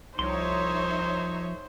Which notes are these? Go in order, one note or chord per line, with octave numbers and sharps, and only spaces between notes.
C2 F3 D#4 C5 C#5 E5 C6